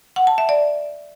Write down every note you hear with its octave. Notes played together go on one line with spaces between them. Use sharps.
F#5
A5
E5
D5